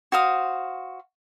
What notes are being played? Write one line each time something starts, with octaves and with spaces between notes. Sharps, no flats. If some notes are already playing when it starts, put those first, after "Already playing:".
F#4 C5 F5 D#6